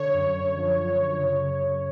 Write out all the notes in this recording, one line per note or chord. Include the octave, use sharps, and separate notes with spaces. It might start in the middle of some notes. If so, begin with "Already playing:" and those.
Already playing: D3 C#5
F#2
F#2
F3
D3
F#2
C#3 C#5
F#2
F#2